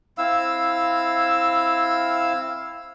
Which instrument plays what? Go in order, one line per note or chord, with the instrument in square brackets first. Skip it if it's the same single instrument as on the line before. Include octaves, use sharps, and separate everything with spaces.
[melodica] C4 E4 F5 E6